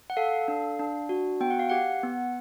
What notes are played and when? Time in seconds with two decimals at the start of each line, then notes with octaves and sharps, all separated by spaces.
0.10 F#5
0.17 A4 F5
0.48 D4
0.79 D4
1.09 F#4
1.41 B3 G5
1.50 F#5
1.59 F5
1.69 G4 F#5
2.03 B3